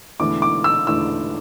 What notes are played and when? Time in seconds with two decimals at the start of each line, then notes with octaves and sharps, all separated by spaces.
0.20 E1 E2 D3 A3 E4 D6
0.42 D6
0.64 E6
0.87 E1 E2 D3 A3 E4 E6